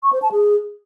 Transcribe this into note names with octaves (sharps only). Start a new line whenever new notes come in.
C#6
C5
A5
G#4